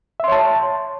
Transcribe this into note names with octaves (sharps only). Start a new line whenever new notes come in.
C#5 E5 A5 C6